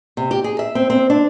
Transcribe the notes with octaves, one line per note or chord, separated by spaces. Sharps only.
C3
G4
G#4
E5
C4
C4
D4